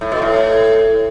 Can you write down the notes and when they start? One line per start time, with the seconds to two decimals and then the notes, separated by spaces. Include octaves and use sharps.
0.01 A2
0.12 B2
0.22 A2